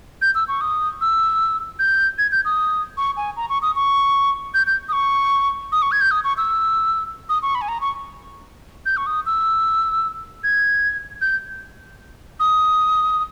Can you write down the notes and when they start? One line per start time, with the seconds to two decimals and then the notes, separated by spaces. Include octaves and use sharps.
0.22 G6
0.35 E6
0.48 C#6
0.61 D#6
1.01 E6
1.79 G6
2.18 G#6
2.32 G6
2.45 D#6
2.97 C#6
3.17 G#5
3.37 A#5
3.49 C#6
3.62 D#6
3.76 C#6
4.54 G6
4.67 G6
4.89 D#6
4.93 C#6
5.72 D#6
5.82 C#6
5.92 G#6
6.01 G6
6.11 D#6
6.24 C#6
6.37 E6
7.29 D#6
7.42 C#6
7.55 B5
7.61 G#5
7.69 A#5
7.81 C#6
8.86 G6
8.97 C#6
9.06 D#6
9.26 E6
10.44 G#6
11.21 G6
12.40 D#6